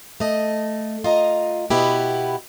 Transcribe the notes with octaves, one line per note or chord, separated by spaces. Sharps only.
A3 D#5
F4 D#5 A#5
B2 B3 E4 G4